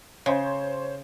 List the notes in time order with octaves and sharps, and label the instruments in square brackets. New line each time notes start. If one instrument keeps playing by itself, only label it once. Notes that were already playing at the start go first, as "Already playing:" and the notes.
[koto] C#3 [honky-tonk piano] C5 C#5